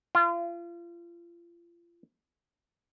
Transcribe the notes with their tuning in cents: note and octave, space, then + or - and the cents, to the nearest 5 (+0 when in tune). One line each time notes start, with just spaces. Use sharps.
F4 -35